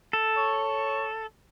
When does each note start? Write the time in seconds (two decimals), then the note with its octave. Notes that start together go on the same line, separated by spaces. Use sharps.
0.13 A4
0.37 C#5